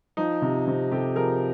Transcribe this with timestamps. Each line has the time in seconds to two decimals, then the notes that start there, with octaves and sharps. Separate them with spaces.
0.17 F3 D#4
0.42 C3
0.67 C3
0.91 C3 G4 A4
1.16 F3 G#4 A#4